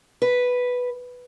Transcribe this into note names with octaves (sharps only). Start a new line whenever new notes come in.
B4